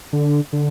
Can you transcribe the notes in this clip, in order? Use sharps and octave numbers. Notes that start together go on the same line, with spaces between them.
D3
D3